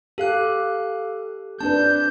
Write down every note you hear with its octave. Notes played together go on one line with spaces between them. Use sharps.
G4 A4 F5 F#6
C4 D4 B4 A5 G6